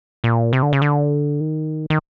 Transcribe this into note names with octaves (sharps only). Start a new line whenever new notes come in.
A#2
C3
D3
C#3
D3
D#3
D#3